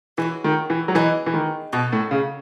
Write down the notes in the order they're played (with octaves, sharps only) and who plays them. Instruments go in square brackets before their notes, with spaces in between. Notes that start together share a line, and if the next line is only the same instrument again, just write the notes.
[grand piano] E3 [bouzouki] G#3 C#4 F#4
[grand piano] D#3
E3
F#3
[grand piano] E3 [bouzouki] B3 D#4 G#4 D#5
[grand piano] E3
D#3
[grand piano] B2 [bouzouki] A3 D#4 F#4
[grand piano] A2
C#3